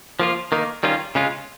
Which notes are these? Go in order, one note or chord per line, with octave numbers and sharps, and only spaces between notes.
F3 A#3 F4
D#3 A#3 D#4
D#3 G3 C#4 F4
C#3 G#3 C#4 F4